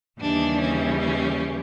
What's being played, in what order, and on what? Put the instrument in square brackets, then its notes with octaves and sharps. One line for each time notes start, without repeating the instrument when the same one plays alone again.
[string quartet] D#2 C#3 E3 G3 D4
C#4
C#4